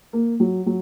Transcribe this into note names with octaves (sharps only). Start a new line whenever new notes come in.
A#3
F#3
F#3